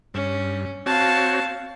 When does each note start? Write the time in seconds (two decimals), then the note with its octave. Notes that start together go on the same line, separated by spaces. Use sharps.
0.14 G2 C#4
0.86 C4 F#4 C#5 F5 A5